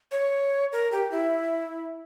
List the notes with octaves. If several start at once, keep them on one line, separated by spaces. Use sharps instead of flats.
C#5
A#4
G4
E4